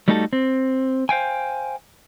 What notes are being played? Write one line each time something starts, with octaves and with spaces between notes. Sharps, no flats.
G3 A3 D#4 F#4 G#4 A4
C4
C5 F5 G5 G#5